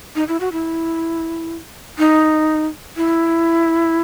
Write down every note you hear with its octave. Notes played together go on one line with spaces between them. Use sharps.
D#4
E4
F#4
E4
D#4
E4